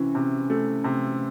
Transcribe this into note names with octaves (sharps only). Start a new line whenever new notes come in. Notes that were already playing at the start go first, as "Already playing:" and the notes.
Already playing: C3 E3 C#4
C3
A3
C3